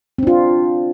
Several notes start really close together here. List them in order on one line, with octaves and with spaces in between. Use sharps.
C4 D4 F4